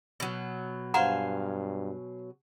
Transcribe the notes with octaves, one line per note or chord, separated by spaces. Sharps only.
B2 F#3
G2 C5 F5 F#5 G#5 A#5